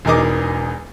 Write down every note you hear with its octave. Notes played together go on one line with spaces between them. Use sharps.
E1 E2 D#4 A#4 D#5 D6